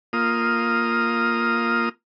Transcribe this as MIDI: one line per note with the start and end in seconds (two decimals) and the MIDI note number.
0.13 1.89 58
0.13 1.89 65
0.13 1.89 87